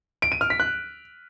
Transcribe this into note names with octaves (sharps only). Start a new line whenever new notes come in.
D7
D#7
F6
B6
F#6